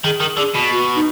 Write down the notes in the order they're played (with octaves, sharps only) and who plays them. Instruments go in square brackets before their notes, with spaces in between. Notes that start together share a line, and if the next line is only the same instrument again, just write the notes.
[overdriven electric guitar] D#3 [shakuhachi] G#4
[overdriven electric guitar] D#3
[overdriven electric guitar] D3 [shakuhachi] G#4
[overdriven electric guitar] B2
[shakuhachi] F#4
D#4